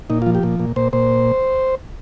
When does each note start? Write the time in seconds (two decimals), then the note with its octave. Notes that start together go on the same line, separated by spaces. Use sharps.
0.10 A#2 D#4
0.22 F4
0.26 F3
0.35 G4
0.43 A#2
0.60 A#2
0.76 A#2 C5
0.93 A#2 C5